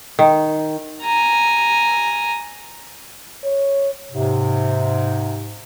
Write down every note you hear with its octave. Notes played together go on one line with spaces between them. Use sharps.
D#3
G#5 A#5
C#5
G#2 C3